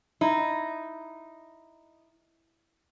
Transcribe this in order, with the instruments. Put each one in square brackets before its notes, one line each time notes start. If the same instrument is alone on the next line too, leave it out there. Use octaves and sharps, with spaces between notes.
[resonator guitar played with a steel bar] D#4 [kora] E4